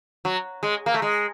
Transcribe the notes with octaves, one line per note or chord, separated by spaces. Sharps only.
F#3
G#3
A#3
A3
G#3